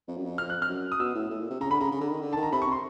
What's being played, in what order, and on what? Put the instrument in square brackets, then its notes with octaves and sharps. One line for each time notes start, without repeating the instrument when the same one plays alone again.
[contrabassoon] F2
F#2
F2
[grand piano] F6
F#6
F6
[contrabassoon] F#2
[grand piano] D#6
[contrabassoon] B2 [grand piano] E6
[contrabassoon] A2
A2
A#2
C3
[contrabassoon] C#3 [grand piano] A#5
[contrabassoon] D3 [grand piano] B5
[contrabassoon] C#3 [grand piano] A#5
[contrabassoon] C#3
D3
D#3
D3
[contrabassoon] D#3 [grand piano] A5
[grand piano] A#5
[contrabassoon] C3 [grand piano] B5
[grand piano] C#6
[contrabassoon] C3 [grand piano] C6